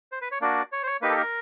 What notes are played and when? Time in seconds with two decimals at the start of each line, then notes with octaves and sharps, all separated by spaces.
0.12 C5
0.22 B4
0.31 C#5
0.41 A#3 D4 F#4 D5
0.72 C#5
0.83 C5
0.86 C#5
1.02 A#3 D#4 G4 B4
1.10 A4
1.17 A#4